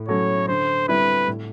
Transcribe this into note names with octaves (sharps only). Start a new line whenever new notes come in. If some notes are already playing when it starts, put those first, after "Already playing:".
Already playing: A2
F#3 A3 C#4 C#5
D3 C5
G3 C4 E4 B4
A2